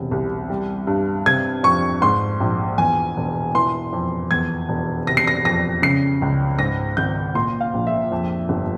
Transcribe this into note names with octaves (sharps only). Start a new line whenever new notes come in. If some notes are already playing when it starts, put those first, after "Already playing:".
Already playing: E1 C3
C2
G3
G2
C3 G#6
F2 C#6
G#2 C6
A#1
E2 G#5
E1
E3 C6
F2
E2 G#6
E1
C3 A#6
C7
A#6
F2 A#6
C#3 C7
C#2
G#2 A#6
G#1 G6
A#2 C6
F5
A#1
E5
F2
G1